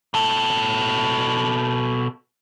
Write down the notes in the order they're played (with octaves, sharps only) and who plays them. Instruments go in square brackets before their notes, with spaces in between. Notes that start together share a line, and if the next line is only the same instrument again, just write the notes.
[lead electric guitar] B2 A4